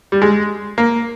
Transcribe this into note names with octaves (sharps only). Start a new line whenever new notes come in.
G3
G#3
A#3